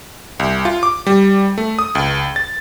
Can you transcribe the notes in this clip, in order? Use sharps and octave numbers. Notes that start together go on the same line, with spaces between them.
C2
F4
D6
G3
A3
D#6
C#2
A6